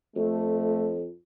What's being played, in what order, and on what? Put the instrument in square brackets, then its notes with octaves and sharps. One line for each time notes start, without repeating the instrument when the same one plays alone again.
[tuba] F2 [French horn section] A3